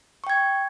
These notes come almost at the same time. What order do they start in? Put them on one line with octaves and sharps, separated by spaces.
C#6 G5 G#6